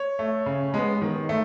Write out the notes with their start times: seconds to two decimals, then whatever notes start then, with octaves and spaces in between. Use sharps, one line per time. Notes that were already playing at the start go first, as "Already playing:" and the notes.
Already playing: C#5
0.19 A3
0.46 C#3
0.74 G#3 B3
1.02 D#3
1.29 A3